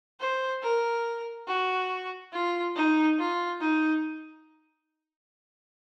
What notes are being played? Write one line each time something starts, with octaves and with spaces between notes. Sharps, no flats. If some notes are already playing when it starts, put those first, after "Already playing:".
C5
A#4
F#4
F4
D#4
F4
D#4